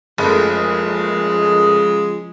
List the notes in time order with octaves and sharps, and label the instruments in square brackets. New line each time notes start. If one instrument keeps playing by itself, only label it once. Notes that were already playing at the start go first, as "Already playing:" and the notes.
[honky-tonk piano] F#1 A3 [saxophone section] C#3 G#3 [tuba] F3